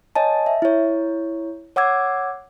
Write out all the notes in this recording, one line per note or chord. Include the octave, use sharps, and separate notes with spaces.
C#5 D#5 G#5 A5
E5
E4 C#5
C#5 F#5 D6 E6 G#6